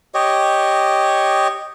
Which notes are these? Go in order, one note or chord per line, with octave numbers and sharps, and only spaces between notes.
G4 C#5 D#5